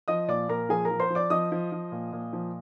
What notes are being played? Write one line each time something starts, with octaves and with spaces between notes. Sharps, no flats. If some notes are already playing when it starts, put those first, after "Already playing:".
F3 D#5 D#6
A#2 D5 D6
A#2 A#4 A#5
F3 G#4 G#5
A#4 A#5
F3
C5 C6
F3
D5 D6
F3 D#5 D#6
F3
F3
A#2
A#2
F3